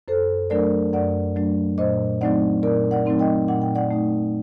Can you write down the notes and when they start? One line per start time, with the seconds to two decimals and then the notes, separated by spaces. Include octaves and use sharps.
0.08 F#2 A4 C5
0.50 F#3 A3 D4 A#4 D5
0.93 F#2 D5 F#5
1.36 F#3 A3 D4
1.78 A#2 C5 D#5
2.21 F#3 A3 C4 D#4 D5 F#5
2.63 A#2 A#4 D5
2.91 D5 F#5
3.06 F#3 A3 C4 D#4
3.19 D#5 G5
3.48 A#2 F#5
3.62 G5
3.75 D5 F#5
3.91 A3 D#4